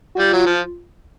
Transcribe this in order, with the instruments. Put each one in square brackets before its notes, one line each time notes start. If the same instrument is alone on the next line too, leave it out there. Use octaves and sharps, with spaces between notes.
[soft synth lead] F#4
[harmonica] G3 [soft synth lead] F4
[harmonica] F#3
F3